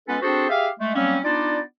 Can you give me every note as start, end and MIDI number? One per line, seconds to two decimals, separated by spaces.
0.08 0.17 56
0.08 0.17 59
0.08 0.17 61
0.08 0.17 65
0.08 0.17 69
0.08 0.17 71
0.22 0.49 60
0.22 0.49 62
0.22 0.49 66
0.22 0.49 68
0.22 0.49 69
0.22 0.49 72
0.50 0.68 67
0.50 0.68 68
0.50 0.68 76
0.50 0.68 77
0.80 0.94 56
0.80 0.94 57
0.95 1.18 54
0.95 1.18 55
0.95 1.18 58
0.95 1.18 60
0.95 1.18 61
1.24 1.59 59
1.24 1.59 62
1.24 1.59 63
1.24 1.59 65
1.24 1.59 74